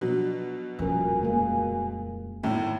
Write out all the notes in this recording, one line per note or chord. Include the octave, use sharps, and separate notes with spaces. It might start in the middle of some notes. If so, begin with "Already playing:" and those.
B2 F3 F#3 D4
D#1 F2 F3 C#4 A#4 G#5
C#3 G#3 A#3
G#1 A2 B3